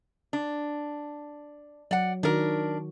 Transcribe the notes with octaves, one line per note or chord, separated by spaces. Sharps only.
D4
F#3 D5 F#5
D#3 D4 F#4 A#4